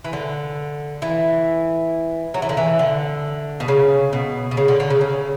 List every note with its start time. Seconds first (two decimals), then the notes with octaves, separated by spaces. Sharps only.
0.04 E3
0.13 D3
1.02 E3
2.34 F#3
2.42 E3
2.49 D3
2.57 E3
2.79 D3
3.60 B2
3.68 C#3
4.13 B2
4.51 B2
4.57 C#3
4.68 D3
4.80 D3
4.90 C#3
5.01 C#3